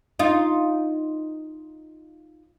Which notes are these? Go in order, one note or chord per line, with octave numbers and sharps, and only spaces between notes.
D#4 F4